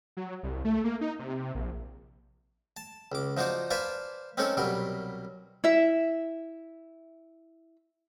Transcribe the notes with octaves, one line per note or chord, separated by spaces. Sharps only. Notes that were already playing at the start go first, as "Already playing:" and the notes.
F#3
C2
A3
A#3
D#4
C3
A#1
A5
C#2 D6
F3 D#4 F#4 C5 D5
B4 C5 D5 F5 G#5 A5
C4 C#4 D#4 A4 A#4 C#5
C2 B2 F#3 G3 A#4
E4 E5